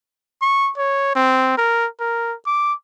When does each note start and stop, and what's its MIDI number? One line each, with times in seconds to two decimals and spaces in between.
0.42 0.71 85
0.78 1.15 73
1.16 1.53 60
1.58 1.87 70
2.00 2.34 70
2.46 2.74 86